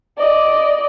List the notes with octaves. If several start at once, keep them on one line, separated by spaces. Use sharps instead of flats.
D5 D#5